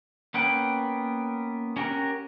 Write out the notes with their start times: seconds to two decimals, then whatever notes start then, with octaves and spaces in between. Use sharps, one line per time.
0.34 A#3 B3 C#4 F#5 G5
1.76 C#4 G4 A#4 F#5